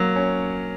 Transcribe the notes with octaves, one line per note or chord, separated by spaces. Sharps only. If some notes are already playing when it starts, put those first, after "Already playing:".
Already playing: F#3 A#3
C#4